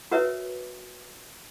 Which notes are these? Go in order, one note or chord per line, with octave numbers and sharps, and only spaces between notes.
F#4 A#4 B4 C#5 E5